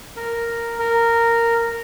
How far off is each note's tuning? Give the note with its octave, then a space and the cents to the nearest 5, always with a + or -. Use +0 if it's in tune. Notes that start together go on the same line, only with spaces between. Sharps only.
A#4 -5
A#4 -10